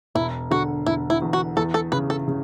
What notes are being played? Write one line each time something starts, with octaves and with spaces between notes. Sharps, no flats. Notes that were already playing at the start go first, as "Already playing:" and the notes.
E1 E4
D3 F#4
E1 E4
E4
E2
F#4
E2 A4
A4
C#3 B4
A4
C#3